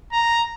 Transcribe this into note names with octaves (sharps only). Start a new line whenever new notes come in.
A#5